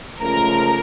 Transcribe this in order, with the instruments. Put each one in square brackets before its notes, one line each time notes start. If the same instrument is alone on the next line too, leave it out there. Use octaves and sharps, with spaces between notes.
[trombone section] C#2 C#3 F3 A3 [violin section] A#4